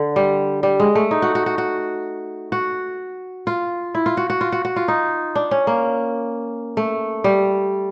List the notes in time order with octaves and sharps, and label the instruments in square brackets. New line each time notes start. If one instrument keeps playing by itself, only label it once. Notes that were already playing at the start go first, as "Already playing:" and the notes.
Already playing: [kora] D3
G3
G3
G#3
A3
D#4
F#4
F#4
F#4
F#4
F#4
F4
E4
F4
F#4
F#4
F4
F#4
F#4
F4
D#4
D4
C#4
A#3
A3
G3